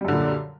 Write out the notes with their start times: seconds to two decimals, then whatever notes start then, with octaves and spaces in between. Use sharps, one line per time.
0.01 G3
0.05 F#2
0.08 D3
0.12 A#2